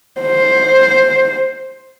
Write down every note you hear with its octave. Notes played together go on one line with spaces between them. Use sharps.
C5